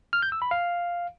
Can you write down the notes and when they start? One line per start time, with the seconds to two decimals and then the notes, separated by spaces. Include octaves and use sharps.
0.13 F6
0.22 G6
0.32 E6
0.42 B5
0.51 F5